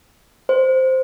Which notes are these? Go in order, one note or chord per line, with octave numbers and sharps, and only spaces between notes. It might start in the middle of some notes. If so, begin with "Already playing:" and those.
C5